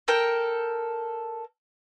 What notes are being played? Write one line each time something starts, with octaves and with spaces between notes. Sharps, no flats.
A4 A#4 G5